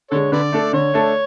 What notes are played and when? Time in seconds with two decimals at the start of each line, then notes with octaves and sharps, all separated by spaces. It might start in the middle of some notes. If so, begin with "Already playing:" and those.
0.11 D3 G#3 A4 C#5
0.32 D3 B4 D5
0.52 A3 D4 A4
0.73 D3 C#5
0.94 A3 D4 A4